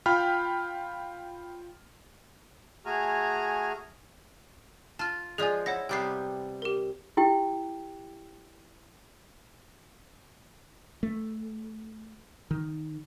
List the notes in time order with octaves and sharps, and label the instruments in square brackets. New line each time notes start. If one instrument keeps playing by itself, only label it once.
[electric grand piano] F4 G5 B5 F6
[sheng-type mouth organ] A3 F#4 G#4 G#5 A#5 F6
[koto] F4 [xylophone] A5 F6
[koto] F3 G#3 [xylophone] G#4 D5 G#5
[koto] E4 [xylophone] C#5 F#5 A#6
[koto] C3 G3 B3 [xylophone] G5 G6 C7
[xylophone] G4 A#4
[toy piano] E4 G4 G5
[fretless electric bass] A3
D#3